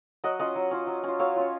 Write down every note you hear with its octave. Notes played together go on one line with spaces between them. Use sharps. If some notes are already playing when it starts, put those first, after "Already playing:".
F#3 D#5 F#5
C#4 F4 D#5 F#5
F#3
C#4 F4
F#3
C#4 F4
F#3 C#5 F5
C#4 F4